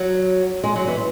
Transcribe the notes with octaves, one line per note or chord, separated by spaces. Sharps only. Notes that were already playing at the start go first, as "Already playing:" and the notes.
Already playing: F#3
G#3
F#3
E3